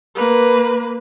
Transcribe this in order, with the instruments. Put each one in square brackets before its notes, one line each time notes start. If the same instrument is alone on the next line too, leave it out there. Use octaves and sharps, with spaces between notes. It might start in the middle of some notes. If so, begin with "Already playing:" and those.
[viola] A#3 B4